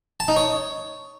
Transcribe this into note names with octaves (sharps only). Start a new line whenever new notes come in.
A5
D#4
C#5